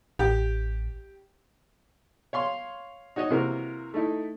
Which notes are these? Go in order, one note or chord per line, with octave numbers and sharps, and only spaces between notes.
A1 G4
C#5 F5 C6
D#4 F#4 C#5 D#5
C3 E3 A#3 F#4 A#4
A3 D#4 E4